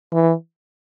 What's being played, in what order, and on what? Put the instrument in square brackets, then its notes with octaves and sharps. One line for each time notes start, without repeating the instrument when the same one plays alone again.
[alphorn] E3